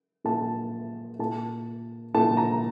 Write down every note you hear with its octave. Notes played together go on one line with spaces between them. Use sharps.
A#2 A5
A#2 A5
A#2 A5
A#5